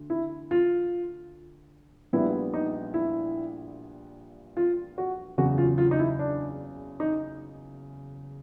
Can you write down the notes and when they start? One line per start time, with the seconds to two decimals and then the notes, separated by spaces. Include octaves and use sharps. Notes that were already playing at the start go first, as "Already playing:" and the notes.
Already playing: D2
0.10 E4
0.51 F4
2.13 A#1 A#2 G3 B3 E4
2.54 D#4
2.94 E4
4.57 F4
4.98 F#4
5.38 F#1 E2 C#3 F#3 F#4
5.58 F4
5.78 F4
5.91 D#4
5.99 E4
6.19 D4
7.00 D#4